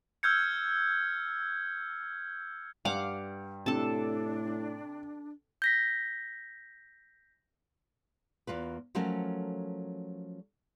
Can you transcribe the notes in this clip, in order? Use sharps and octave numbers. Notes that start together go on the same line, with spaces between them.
E6 F6 G6 G#6 C#7
G2 F5 F#5 D6
A2 C3 D4 A4 A5
G6 A#6 B6
E2 A#3 F4 B4
F3 F#3 A3 C#4 A4 A#4